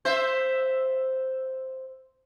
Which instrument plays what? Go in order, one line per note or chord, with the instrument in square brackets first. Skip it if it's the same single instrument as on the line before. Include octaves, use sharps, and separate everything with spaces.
[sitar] C5 E5